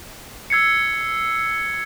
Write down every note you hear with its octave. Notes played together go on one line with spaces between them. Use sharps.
E6 G#6 C7 C#7